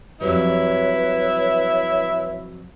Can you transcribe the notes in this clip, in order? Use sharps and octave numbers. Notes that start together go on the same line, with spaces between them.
F2 F#3 G3 E4 B4 C#5